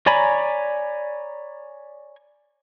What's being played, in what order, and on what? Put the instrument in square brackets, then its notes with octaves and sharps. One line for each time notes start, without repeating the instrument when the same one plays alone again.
[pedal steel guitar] C#5 D5 G#5 A#5 B5